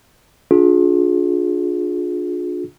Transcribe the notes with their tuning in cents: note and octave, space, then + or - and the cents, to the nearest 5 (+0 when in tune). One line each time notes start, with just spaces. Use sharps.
D4 +0 F4 +35 G#4 +15